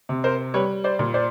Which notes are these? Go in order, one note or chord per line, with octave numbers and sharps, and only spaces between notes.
C3
A#4 C5
G3 B4 C#5
C5 D5
A#2
C5 D5